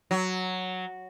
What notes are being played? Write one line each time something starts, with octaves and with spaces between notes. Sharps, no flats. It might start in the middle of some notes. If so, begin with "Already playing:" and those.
F#3